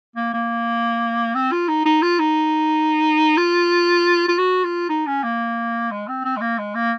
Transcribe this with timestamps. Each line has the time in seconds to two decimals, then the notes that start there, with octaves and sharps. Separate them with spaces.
0.16 A#3
0.33 A#3
1.35 C4
1.52 F4
1.68 D#4
1.86 D#4
2.02 F4
2.19 D#4
3.37 F4
4.28 F4
4.39 F#4
4.64 F4
4.89 D#4
5.07 C#4
5.23 A#3
5.91 G#3
6.08 C4
6.24 C4
6.36 G#3
6.41 A#3
6.58 G#3
6.75 A#3